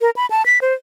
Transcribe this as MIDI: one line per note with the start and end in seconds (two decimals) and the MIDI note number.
0.01 0.10 70
0.16 0.26 83
0.30 0.45 81
0.46 0.59 95
0.61 0.73 72